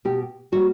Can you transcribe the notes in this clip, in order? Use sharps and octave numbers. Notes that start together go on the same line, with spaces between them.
B2 G4
G3 A#3 F#4